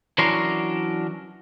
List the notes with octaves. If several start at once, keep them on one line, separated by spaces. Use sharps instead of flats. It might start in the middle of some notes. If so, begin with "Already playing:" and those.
E3 F#3 C#4 D4 A#4 C6